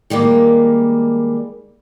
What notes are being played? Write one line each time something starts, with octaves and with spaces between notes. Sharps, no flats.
D#3 G3 G#3 A#3